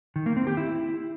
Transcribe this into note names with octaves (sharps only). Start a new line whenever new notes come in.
D#3
A#3
C4
G4
E4